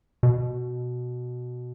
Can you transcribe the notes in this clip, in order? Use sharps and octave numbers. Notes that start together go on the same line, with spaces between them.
B2